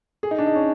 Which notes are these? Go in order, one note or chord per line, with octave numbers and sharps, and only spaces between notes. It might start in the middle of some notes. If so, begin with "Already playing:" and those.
G#4
D#4
D4
D#4
C#4